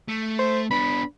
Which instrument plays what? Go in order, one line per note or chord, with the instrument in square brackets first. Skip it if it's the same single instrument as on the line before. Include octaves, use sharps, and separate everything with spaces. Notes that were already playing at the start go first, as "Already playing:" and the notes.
[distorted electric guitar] A3
[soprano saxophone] C5
[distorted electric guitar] B3 D4 [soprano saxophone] B5